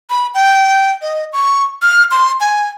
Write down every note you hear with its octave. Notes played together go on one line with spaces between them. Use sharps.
B5
G5
D#5
C#6
F6
C6
G#5